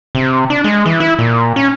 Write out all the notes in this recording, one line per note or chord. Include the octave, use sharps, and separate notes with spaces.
C3
D4
G#3
E3
E4
A#2
C#4